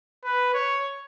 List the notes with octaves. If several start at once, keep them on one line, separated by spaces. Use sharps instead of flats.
B4
C#5